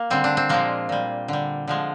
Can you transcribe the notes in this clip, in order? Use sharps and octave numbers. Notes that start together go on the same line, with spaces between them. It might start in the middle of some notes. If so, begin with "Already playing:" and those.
Already playing: A#3
D3 G3 C4
D4
C4
A#2 F3 G#3 A#3
A#2 G3
D3 G3
D3 F3 G#3